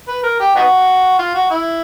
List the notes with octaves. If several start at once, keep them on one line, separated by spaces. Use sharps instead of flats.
B4
A#4
G4
B3 D#4 F#4
F4
F#4
E4